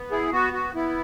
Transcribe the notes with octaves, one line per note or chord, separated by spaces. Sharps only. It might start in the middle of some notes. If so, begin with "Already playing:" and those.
Already playing: B3
E4 G#4
B3 F#4
F#4
B3 E4